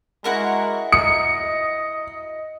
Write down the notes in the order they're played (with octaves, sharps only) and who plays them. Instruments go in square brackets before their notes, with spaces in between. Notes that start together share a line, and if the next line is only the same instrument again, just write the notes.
[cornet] G#3 [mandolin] E4 F#4 A#4
[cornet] D#5 [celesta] D#6 [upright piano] C#7